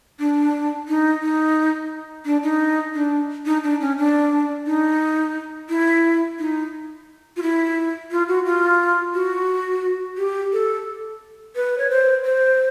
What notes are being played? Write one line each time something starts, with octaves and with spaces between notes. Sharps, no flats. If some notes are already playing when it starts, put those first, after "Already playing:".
D4
D#4
D#4
D4
D#4
D4
D#4
D4
C#4
D4
D#4
E4
D#4
F4
E4
F4
F#4
F4
F#4
G4
A4
B4
C#5
C5
C5